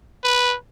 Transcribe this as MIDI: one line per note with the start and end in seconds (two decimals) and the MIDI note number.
0.24 0.55 71